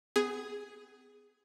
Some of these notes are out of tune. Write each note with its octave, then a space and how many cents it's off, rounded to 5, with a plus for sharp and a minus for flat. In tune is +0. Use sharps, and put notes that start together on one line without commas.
B3 +40 G#4 +0